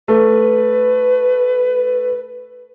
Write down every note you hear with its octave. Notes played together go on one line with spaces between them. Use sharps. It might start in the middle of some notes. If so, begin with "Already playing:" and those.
A3 B4